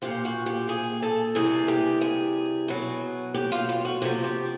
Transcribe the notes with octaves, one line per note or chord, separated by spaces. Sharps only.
A#2 F3 G4
F#4
G4
G#4
A4
C3 E3 G3 G#4
G4
G#4
B2 F#3
G4
F4
F4
F#4
C3 F3 G4
G4